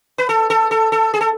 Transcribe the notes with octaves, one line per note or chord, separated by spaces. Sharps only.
B4
A4
A4
A4
A4
G#4
A4